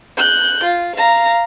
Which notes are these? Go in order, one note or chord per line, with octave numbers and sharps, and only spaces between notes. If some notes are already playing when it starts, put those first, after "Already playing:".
F#6 G6
F4
F5 A#5